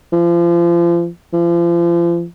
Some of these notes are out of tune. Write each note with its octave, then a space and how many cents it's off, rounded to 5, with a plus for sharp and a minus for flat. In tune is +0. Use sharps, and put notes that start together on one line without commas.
F3 -35
F3 -35